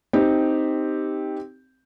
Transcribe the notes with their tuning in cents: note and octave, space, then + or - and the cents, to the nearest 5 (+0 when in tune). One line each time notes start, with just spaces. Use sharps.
C4 -5 D#4 +0 G4 +0